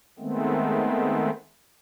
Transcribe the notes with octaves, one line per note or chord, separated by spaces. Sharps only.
D#3 G#3 A3 B3 C4